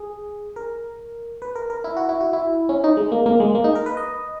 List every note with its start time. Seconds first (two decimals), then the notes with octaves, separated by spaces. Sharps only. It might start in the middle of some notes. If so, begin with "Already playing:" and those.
Already playing: G#4
0.56 A#4
1.42 B4
1.56 A#4
1.70 A#4
1.84 E4
1.97 F#4
2.09 E4
2.21 F#4
2.33 E4
2.69 C#4
2.84 D#4
2.97 G#3
3.12 A#3
3.26 A#3
3.40 G#3
3.55 A#3
3.64 D#4
3.75 A#4
3.86 B4
3.97 D#5